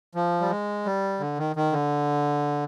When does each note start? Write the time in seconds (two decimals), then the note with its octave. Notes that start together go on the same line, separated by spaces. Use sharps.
0.15 F3
0.41 G3
0.50 G#3
0.85 G3
1.20 D3
1.38 D#3
1.56 D#3
1.72 D3